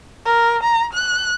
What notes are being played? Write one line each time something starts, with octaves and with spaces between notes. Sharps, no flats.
A#4
A#5
F#6